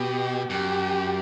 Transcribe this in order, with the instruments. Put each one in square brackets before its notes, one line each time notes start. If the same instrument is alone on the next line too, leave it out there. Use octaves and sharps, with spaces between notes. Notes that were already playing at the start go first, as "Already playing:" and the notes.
Already playing: [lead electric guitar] B2 [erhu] G4
[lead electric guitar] F#2 [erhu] G4